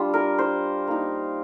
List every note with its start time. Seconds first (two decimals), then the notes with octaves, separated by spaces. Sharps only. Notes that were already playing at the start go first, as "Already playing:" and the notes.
Already playing: G3 D4 F4
0.14 A#4
0.39 C5
0.87 A#3 D#4